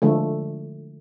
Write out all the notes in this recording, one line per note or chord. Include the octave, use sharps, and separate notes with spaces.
D3 F3 G#3 A3